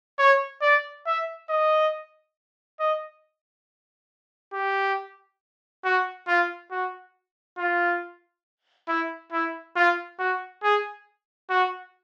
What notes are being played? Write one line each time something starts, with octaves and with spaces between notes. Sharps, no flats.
C#5
D5
E5
D#5
D#5
G4
F#4
F4
F#4
F4
E4
E4
F4
F#4
G#4
F#4